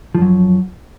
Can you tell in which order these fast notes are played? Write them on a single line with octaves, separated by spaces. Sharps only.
F3 F#2 F#3